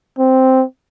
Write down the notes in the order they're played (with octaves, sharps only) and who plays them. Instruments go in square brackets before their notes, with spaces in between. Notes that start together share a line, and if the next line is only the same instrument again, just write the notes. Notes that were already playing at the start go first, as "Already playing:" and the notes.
[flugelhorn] C4